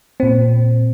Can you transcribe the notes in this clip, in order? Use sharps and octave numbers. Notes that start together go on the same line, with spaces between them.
A#2 C4